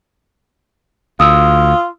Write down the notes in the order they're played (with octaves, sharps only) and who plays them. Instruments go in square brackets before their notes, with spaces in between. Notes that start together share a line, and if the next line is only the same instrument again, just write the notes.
[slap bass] D2 [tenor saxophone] F4 [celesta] D#6 E6